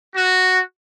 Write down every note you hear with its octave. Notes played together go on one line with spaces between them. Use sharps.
F#4